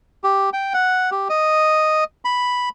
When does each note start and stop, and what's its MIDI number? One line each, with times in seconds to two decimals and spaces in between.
0.24 0.50 67
0.53 0.73 79
0.74 1.10 78
1.11 1.28 67
1.29 2.04 75
2.25 2.69 83